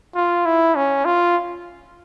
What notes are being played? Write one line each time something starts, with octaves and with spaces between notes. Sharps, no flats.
F4
E4
C#4
F4